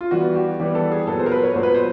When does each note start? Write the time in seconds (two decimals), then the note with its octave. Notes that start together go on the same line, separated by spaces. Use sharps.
0.01 F4
0.11 E3 G3 B3 F#4
0.35 G4
0.60 E3 G3 B3 G4
0.75 A4
0.92 G#4
1.07 A#2 F#3 B3 A4
1.19 C5
1.26 A#4
1.32 B4
1.43 C#5
1.54 A#2 F#3 B3 C5
1.63 B4
1.74 C5